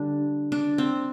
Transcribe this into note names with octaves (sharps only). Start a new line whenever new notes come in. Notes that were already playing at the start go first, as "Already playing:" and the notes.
Already playing: D3 G3 D4
D4
C4